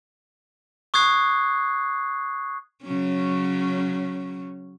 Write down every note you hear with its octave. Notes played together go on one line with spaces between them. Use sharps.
C#6 D#6 F#6 G#6 C7
C#3 F#3 C#4